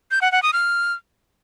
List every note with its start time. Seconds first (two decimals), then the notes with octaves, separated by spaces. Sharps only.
0.11 G6
0.22 F#5
0.32 F#5
0.43 D#6
0.53 F6